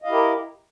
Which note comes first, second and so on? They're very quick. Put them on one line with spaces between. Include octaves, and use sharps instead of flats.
D#5 F5 E4 G4 A#4